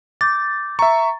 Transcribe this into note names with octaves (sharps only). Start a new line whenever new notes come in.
D6 G6 A6
E5 A#5 C#6